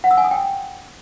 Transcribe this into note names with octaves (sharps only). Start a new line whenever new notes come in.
F#5
E6
G#5
D#6
G5